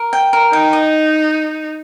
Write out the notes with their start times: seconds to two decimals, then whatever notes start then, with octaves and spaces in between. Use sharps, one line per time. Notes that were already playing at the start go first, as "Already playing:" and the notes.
Already playing: A#4
0.13 G5
0.33 A#4
0.52 D#4 G5
0.73 D#5